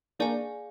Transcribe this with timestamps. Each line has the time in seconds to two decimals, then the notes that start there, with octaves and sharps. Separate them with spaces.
0.19 A#3 D4 G#4 D5 F5 G#5